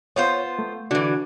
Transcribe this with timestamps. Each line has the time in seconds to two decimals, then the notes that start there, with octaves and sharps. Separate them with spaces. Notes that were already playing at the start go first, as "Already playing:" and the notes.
0.16 B3 F4 C5 C#5
0.59 A3
0.91 D3 E3 D4 F#4